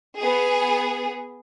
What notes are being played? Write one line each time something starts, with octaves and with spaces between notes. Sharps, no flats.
B3 G#4